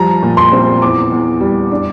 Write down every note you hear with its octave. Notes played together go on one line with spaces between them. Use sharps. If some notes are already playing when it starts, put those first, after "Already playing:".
Already playing: F3 G3 A#5
A#2
C6
C4
E2 D6
E2
G3
D4